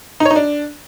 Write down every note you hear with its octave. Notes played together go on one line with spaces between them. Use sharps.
D#4
C#5
D#4
D4